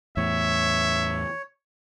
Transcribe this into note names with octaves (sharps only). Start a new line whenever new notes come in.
E2 A2 C#5 E5